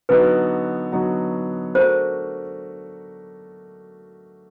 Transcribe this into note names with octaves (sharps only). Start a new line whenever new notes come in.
D3 F#3 B3 D#4 F#4 B4
D3 F#3 B3 D#4 F#4
A3 D4 F#4 A#4 C5